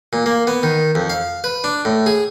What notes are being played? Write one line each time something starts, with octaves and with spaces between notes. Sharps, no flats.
A#2
A#3
B3
D#3
F2
F5
B4
D4
A2
G#4